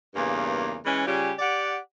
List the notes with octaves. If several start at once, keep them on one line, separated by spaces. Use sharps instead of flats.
E2 G2 C#3 A#3
E3 G#3 C#4
C#3 G3 C#4 F4 G4
G4 D5 F#5